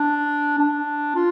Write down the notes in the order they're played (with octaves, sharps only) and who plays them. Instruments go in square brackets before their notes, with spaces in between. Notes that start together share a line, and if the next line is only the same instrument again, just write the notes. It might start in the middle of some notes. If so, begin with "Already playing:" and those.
Already playing: [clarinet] D4
D4
F4